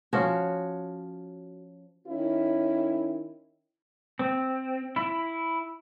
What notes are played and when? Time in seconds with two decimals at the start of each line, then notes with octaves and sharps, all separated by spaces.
0.13 F3 C#4 F#4
2.06 D#3 C#4 E4
4.19 C4
4.96 E4